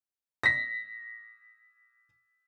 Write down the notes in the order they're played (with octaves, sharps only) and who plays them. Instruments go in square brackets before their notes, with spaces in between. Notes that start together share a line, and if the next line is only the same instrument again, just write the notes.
[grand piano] A#6 B6